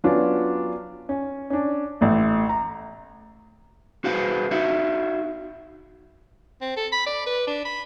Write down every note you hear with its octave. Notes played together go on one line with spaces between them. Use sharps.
F#3 B3 C#4 D4 F4
C#4
C#4 D4
A1 A3
A#5
F#4 G#4 B4 C5 F5
D#4 F#4 E5 F5
C4
A4
B5
D5
B4
D4
B5